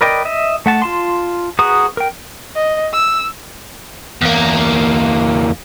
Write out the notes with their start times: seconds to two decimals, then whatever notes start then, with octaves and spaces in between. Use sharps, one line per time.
0.01 A#4 B4 D5 D#5 G5
0.25 D#5 E5
0.66 A3 F#5 A5
0.82 F4 A5 C6
1.59 F#4 G#4 B4 A#5 D#6
1.97 A#4 G5
2.56 D#5
2.93 E6
4.22 E2 A#3